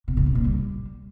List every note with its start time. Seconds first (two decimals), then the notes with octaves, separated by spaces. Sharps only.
0.08 B2
0.17 C#3
0.26 C3
0.35 A#2
0.44 G3